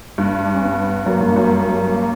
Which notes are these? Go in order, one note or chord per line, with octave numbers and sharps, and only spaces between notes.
G2
G3
D4
C#4
B3
F#2 A#3
G2
F#2
A#3
G3
A#3